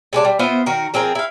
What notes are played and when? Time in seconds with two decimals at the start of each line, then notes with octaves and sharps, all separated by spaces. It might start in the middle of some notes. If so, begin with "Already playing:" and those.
0.13 C3 G#3 D5 A5
0.25 G3
0.39 B3 F4 C5 E5
0.66 D#3 F#4 A#4
0.94 F3 C4 G#4 A#4
1.15 E4 F5